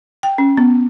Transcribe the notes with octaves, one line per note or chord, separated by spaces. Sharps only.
G5
C#4
B3